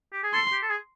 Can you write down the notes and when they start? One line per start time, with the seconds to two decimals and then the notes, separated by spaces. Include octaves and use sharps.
0.13 G4
0.23 G#4
0.33 A4 C6
0.52 G4
0.62 A4
0.70 G#4